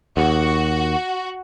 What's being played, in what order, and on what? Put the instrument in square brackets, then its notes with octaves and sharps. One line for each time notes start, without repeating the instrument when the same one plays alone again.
[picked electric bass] D#2 [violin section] F#4